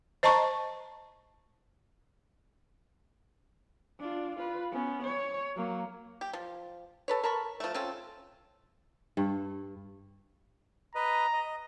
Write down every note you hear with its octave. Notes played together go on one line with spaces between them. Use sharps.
C5 D#5 A5 A#5 C#6
D4 F4
F4 B4
B3 C#4
C#5
F#3 A#3
G4
F3
A4 B4 C#5
A#4 A5 B5 C#6
F3 A3
C4 C#4 F4 A4
G2
B4 D#5 A#5
D#5